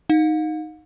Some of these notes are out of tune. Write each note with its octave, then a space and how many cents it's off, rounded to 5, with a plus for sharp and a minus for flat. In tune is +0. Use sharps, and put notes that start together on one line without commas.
D#4 +0 F5 +45